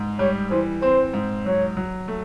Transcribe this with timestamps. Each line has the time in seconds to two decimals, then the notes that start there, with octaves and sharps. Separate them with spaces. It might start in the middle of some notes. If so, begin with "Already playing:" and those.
Already playing: G#2
0.19 G3 C#5
0.51 E3 C5
0.82 C4 C5
1.14 G#2
1.46 F#3 C#5
1.77 F#3
2.08 A3